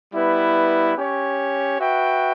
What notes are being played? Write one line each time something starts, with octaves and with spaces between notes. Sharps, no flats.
G3 B3 E4 B4
C#4 G4 C#5
F#4 B4 E5 G5